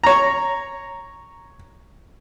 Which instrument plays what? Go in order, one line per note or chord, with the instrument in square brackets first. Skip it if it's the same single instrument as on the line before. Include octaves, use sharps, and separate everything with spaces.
[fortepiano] C#5 A#5